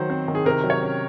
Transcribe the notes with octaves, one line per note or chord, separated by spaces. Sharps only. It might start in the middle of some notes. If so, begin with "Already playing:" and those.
Already playing: D#3 F#3 C5
C4
D#3
G#4
C3 A#4
F#3
C#5
C#4